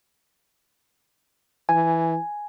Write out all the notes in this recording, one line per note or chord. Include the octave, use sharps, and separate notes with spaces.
E3 G#5